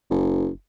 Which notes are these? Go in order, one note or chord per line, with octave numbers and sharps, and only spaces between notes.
F#1